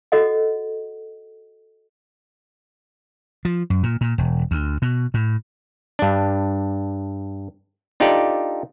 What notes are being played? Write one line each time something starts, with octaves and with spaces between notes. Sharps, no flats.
F#4 A4 D#5 F#5
F3
F#2
A#2
A#2
E1
D2
B2
A2
G2 D4
D4 D#4 F4 G4 A4 D5